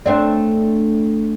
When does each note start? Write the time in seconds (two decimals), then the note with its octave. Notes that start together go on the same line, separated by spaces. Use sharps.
0.06 A3 C4 D4